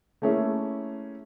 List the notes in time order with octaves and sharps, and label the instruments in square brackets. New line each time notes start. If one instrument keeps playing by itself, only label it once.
[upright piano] A3 A#3 C#4 E4 G#4